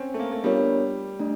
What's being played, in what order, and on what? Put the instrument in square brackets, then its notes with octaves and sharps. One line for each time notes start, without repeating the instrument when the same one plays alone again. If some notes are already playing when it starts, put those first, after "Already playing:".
Already playing: [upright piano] C4 C#4
A3
A#3
A3
[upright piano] G3 [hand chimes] B3 D4 F4 A#4 C#5
[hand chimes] A3 D4